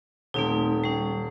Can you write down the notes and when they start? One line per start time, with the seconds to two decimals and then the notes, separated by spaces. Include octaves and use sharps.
0.34 D#1 A3 C4 D#4
0.84 G3 C#4